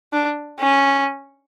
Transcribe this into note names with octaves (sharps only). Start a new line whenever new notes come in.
D4
C#4